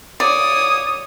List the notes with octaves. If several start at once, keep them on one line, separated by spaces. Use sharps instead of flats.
C#5 D5 D#6